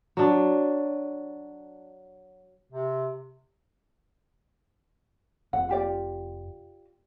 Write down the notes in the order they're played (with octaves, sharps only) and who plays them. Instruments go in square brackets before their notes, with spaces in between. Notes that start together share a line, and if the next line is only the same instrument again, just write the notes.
[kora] F#3 D4
[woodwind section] C3
[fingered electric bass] F1 [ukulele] F#5
[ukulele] F4 G4 D5